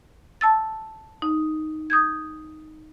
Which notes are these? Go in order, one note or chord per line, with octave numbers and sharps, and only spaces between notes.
A5 E6 A6
D#4
D#6 G6 G#6